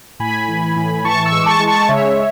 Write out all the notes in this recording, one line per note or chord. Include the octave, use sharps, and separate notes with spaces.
A2 G#5 B5
E3
A2
E3 A5 C#6
C#6 E6
G#3
D6
A5 C#6
G#3
A5 C#6
C#3 C#5 E5